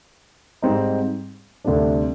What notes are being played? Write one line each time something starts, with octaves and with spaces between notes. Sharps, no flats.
G#2 G3 C4 D#4
D2 C3 G3 D4